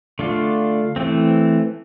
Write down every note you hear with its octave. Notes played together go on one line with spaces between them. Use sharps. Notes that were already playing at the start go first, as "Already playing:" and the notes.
D3 A3 D4 F4
E3 A3 C4